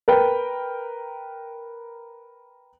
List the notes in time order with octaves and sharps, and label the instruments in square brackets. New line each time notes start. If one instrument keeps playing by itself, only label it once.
[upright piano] A#4 B4 G5